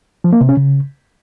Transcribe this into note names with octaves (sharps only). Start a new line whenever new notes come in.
F3
A#3
C3
C#4
C#3